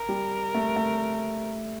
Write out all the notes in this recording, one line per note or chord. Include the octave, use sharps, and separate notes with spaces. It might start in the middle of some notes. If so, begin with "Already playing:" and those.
Already playing: A#4
G3
A3
A3